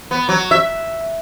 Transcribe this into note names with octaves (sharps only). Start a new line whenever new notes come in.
B3
F#3
E5